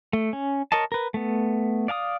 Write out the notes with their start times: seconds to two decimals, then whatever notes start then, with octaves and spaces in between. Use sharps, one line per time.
0.13 A3
0.33 C#4
0.72 A#4 C#5 D#5 A5
0.92 A#4 B4
1.14 A3 B3
1.88 D5 F5 G#5 D#6